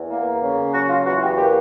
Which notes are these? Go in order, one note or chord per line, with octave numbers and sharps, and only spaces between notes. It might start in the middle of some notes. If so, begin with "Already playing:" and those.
Already playing: E2
A#3
C#3
F#3 F#4
F4
E2 F#4
G4
A#3 G4